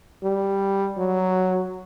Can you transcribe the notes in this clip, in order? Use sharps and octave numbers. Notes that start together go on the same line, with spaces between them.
G3
F#3